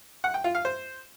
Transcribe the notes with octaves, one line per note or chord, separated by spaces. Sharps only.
F#5
G5
F4
F5
C5